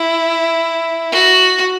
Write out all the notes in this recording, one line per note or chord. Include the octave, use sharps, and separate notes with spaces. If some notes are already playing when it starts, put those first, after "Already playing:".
Already playing: E4
F#4